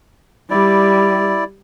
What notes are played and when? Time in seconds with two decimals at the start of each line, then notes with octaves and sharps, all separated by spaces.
0.50 G3 E4 D5